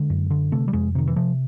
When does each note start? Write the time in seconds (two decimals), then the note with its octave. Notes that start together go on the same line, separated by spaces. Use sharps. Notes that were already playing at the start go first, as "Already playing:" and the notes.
Already playing: D3 G#3
0.10 F#2
0.30 D3
0.52 C3 A3
0.68 G3
0.73 F2 G#3
0.95 C3 D#3
1.08 E3
1.16 C3 F3